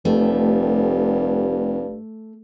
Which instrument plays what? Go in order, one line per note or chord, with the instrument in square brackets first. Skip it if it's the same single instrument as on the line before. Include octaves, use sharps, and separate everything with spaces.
[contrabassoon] F1 [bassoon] G2 [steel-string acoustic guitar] A3